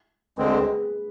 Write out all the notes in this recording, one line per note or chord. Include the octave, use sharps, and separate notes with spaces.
D2 D3 G#3 C4 B4
G#4
B4